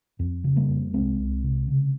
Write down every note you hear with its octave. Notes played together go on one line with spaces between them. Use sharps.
F2
C#3
G3 A#3
F2
C2 G#3 C4
C2
C3
C#3